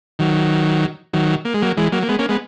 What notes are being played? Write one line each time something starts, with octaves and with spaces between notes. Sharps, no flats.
D#3 F#3
D#3 F#3
A#3
G#3
F#3 A#3
E3 G#3
F#3 A#3
A#3
G#3 B3
A#3 C#4
G#3 B3